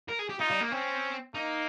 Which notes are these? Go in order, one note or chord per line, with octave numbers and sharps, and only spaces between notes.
A#4
G#4
G4
D#4 F4
G3
A#3
C4 C#4
A#3 D#4